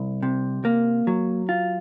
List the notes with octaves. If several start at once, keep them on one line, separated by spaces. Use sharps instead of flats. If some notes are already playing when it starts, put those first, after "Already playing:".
Already playing: C2
C3
A#3
F#3
F4